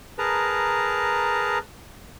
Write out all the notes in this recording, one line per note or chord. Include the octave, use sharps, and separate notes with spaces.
G#4 A#4 B4 A5 A#5